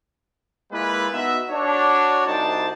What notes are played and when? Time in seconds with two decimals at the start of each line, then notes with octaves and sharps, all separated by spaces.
0.72 G#3 A#3 E4 F4 B4
1.13 B3 D#4 F#4 E5
1.51 D4 F#4 C#5
2.26 C2 D#4 F#4 C5 D5 A5